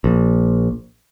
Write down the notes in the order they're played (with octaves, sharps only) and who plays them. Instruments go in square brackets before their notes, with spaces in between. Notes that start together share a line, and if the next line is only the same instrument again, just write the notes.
[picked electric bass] A#1